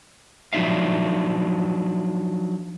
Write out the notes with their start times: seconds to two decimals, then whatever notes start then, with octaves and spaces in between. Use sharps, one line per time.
0.53 F3 F#3 D4 D#4 E5 F5